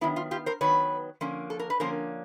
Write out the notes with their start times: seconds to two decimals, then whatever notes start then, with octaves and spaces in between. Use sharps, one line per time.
0.01 D#3 F#3 B3 E4
0.16 F4
0.31 F4 G4
0.46 A#4 C5
0.61 D#3 F#3 B3 B4 C#5
1.21 D3 F3 A#3 C#4
1.50 A4
1.59 A#4
1.70 B4
1.80 D3 F3 A#3 C#4 A#4 C5